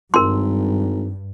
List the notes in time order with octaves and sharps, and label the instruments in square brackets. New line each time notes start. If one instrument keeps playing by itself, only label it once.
[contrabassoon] G#1 [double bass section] G2 [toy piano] A#4 C6